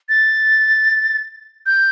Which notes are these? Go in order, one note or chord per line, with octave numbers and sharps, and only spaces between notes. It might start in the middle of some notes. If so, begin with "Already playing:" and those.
A6
G6